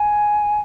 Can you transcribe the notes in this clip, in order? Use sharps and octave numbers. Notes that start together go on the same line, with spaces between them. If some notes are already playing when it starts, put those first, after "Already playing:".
Already playing: G#5